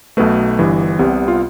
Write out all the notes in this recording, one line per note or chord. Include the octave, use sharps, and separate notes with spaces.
B1 B2 A3 B4
G1 G2 E3
C2 C3 G3 B3
F4